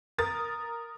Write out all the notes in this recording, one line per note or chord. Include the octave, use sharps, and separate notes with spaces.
A#4 D#6 A6